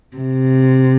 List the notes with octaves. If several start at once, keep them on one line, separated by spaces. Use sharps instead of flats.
C3